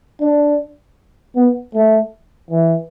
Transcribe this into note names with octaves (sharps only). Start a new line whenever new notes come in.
D4
B3
A3
E3